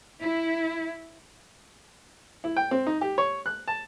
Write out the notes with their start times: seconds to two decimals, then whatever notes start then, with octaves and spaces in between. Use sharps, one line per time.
0.22 E4
2.44 E4
2.56 G5
2.71 C4
2.87 D#4
3.01 G4
3.18 C#5
3.46 F#6
3.68 A5